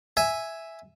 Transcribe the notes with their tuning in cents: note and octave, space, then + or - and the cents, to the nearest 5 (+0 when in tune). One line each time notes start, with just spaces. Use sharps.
E5 +0 G#5 +0